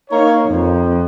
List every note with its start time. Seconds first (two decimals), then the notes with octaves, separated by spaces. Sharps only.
0.10 A#3 D#4 A#4 C#5
0.47 F2